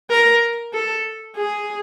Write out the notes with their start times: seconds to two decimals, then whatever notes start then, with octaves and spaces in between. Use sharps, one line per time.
0.10 A#4
0.73 A4
1.36 G#4